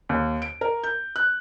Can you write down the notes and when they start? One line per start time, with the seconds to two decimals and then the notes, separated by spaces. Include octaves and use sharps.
0.09 D#2
0.42 D7
0.61 A#4
0.84 G6
1.16 F#6